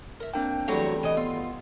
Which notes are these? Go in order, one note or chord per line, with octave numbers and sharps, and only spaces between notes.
A#4 E5
A#3 C4 D4 G5 A5
E2 F#3 G3 A3 F#4 C#5
E3 D#5
B3 F4